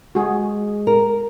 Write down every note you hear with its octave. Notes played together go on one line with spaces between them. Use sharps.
G#3 F#4 G#4
A#4